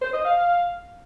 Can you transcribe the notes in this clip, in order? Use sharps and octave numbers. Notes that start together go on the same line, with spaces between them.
C5
D#5
F5